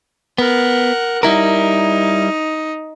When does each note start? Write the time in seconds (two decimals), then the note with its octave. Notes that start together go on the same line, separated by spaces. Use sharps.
0.38 B3 A#4 F#5
1.23 G3 D#4 E4 A#4